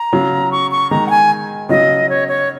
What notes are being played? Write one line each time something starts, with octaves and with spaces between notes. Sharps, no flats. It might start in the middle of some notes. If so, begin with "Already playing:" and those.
Already playing: A#5
C#3 F#3
C#6
C#6
D#3 G#3 A#5
F#5
G#5
C#3 F#3 D#5
C#5
C#5